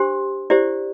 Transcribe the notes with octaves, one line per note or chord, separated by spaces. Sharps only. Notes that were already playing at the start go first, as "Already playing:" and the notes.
Already playing: D4 G4 C5 C6
E4 G4 C5 D5